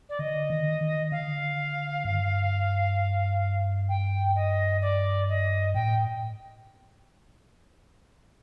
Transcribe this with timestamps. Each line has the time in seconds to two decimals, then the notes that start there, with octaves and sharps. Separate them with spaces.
0.09 D5
0.19 D3 D#5
0.50 D#3
0.81 D#3
1.12 D3 F5
2.04 G2
3.89 G5
4.36 D#5
4.82 D5
5.29 D#5
5.74 A2 G5